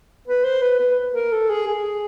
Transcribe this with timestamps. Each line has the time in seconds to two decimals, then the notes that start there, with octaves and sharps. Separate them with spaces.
0.27 B4
0.44 C5
0.62 B4
0.79 B4
1.14 A#4
1.32 A4
1.50 G#4
1.67 G#4